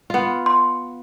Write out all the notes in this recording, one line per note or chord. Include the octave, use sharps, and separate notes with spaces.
B3 F4
C6